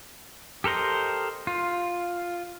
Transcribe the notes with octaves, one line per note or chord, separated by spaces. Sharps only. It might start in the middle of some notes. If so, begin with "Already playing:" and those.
G4 A4 A#4 C5 D#5
F4